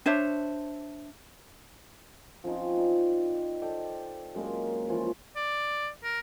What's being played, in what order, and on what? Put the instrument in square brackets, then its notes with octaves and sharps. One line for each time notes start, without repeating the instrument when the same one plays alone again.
[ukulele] D4 C5 C#5 E5
[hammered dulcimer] F3 C4 C#4 D#4
D#4 D5
A4 D5 D#5 G5
F#2 G#3 A#3 A#4
E3 F3 C#4 F4
[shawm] D5
A#4